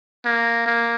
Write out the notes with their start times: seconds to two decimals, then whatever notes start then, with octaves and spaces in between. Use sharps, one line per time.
0.25 A#3
0.66 A#3